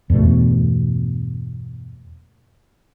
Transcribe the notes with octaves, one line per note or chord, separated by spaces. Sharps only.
E2 G2 B2 A3